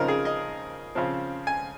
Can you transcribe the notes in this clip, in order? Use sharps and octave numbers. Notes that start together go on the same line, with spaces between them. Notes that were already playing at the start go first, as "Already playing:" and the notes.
Already playing: C#3 F3 C4 D#4 A#4
G#4
D#5
C#3 F3 C4
G#5